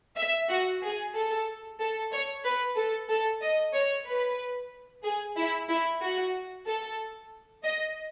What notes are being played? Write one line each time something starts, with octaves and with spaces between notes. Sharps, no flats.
E5
F#4
G#4
A4
A4
C#5
B4
A4
A4
D#5
C#5
B4
G#4
E4
E4
F#4
A4
D#5